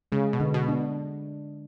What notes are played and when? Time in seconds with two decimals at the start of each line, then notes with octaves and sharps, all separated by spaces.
0.12 C#3 G#3
0.33 B2
0.40 D3
0.54 B2
0.68 D4